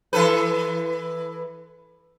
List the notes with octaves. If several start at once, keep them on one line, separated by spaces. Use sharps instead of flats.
E3 A4 B4